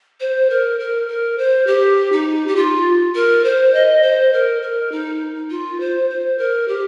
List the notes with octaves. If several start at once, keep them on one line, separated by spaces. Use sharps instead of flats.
C5
A#4
A#4
A#4
C5
G4
D#4
G4
F4
A#4
C5
D#5
C5
A#4
A#4
D#4
F4
C5
C5
A#4
G4